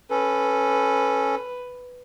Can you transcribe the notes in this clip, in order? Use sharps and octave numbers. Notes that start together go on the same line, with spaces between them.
C#4 A4 B4